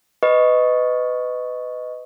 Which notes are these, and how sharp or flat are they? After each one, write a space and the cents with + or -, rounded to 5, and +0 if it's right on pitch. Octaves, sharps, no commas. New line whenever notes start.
B4 +25 D#5 +0 C#6 +0